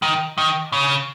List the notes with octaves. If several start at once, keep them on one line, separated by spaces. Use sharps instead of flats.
D#3
D#3
C#3